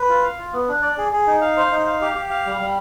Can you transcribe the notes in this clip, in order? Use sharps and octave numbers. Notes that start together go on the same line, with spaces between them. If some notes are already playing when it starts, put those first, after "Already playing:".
Already playing: B4
F4
F5
F4
B3
D4
D5
G#4
G#4
D#4
F5
C5
D#4
F5
G4
G4
F5
G3
G3